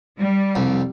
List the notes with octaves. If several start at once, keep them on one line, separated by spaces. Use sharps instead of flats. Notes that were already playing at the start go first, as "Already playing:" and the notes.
G3
C2 F2